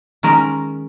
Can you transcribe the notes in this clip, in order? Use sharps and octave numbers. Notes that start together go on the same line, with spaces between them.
D#3 G#3 C#4 A#4